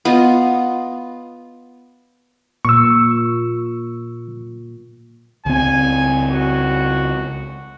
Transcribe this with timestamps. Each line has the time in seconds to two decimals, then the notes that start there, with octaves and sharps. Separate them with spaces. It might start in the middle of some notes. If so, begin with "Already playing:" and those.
0.05 B3 F4 D#5
2.65 A#2 C#6 E6
5.46 C#2 C4 G#5
6.30 F#4